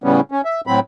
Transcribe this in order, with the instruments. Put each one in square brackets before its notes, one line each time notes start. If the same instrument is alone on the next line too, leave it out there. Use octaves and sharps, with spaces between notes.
[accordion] A2 C#3 G3 B3 C#4
C#4
E5
A2 F#3 C4 B5